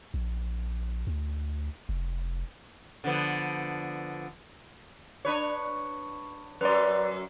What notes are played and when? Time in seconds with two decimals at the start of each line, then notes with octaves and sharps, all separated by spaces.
0.14 A#1
1.07 D2
1.89 F1
3.04 D3 F3 B3
5.25 D4 B4 C#5
6.61 F#2 F#3 B4 D5